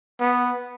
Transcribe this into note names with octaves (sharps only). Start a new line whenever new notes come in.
B3